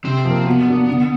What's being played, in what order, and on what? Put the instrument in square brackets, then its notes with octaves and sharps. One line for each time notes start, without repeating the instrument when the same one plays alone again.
[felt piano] C3 [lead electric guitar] C4
[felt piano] F3 A#3
[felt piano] F#3 [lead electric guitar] B3
[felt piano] A#3 D4 F#4
D3